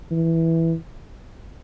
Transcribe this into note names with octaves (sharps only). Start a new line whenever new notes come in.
E3